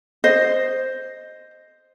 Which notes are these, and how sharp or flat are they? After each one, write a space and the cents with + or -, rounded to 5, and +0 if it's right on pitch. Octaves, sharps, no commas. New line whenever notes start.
C5 +0 D#5 -5